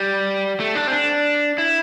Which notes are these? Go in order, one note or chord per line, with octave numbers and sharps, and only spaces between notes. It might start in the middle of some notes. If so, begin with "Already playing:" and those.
Already playing: G3
A3
D4
C4
D4
E4